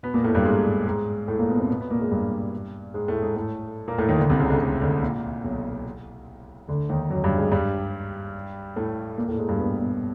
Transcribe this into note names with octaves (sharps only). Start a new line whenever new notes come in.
B2 B3
A#2 A#3
A2 A3
G2 G3
G#2 G#3
G#2 G#3
A2 A3
A#2 A#3
B2 B3
C3 C4
B2 B3
B2 B3
A#2 A#3
G#2 G#3
G2 G3
G#2 G#3
A2 A3
G#2 G#3
A2 A3
A#2 A#3
A2 A3
D#2 D#3
D2 D3
C2 C3
C#2 C#3
D2 D3
D2 D3
D2 D3
A#2
B1 B2
D2 D3
D#2 D#3
F#2 F#3
G2 G3
G#2 G#3
G2 G3
A2 A3
A#2 A#3
A2 A3
G#2 G#3
G2 G3
B2 B3
B2 B3